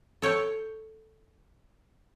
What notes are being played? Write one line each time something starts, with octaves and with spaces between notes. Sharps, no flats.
A4 C#5 G5 A5